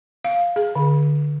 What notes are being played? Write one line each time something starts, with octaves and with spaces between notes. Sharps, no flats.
F5
G#4
D3